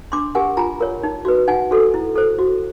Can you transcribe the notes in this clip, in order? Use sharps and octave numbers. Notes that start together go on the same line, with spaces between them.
D4 C6 D6
G4 A#4 F#5 G#5
F4 G#5 A#5
A#4 C#5
D#4
F#4 B4
D#4 F#5 G#5
F#4 A4
E4
A4 C5
F#4